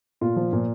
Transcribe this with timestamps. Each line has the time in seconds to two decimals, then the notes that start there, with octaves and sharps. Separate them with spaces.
0.21 A#2 F4
0.36 F3
0.53 A#2